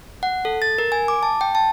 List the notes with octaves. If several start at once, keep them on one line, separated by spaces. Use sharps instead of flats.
F#5
A4
A6
A#4
G#5
D6
A5
G5
A5